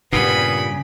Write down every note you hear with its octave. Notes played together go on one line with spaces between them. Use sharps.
G2 A#2 C#3 G3 B3 B5 D#6